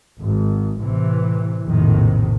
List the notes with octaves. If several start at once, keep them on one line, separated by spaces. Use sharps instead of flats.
G#1
A1 C3 E3
A#1 F2 A2 C3 D#3